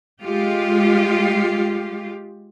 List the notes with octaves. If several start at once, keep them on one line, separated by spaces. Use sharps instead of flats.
G#3 F4 G4